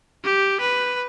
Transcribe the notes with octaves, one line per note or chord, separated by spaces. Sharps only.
G4
B4